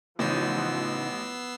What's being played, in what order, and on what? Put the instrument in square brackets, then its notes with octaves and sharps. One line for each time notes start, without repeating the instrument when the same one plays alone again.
[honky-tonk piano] A1 [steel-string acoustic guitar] C#3 D#4 [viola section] F3 F#5 [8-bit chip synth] B3 E6 C7